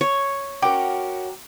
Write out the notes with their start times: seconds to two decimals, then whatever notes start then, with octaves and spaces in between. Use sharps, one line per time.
0.01 C#5
0.62 C#4 F#4 A#4 G5 D6